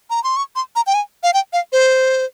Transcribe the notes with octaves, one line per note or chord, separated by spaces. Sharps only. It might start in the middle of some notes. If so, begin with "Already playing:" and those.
A#5
C6
C#6
C6
A#5
G5
G#5
F5
G5
F5
C5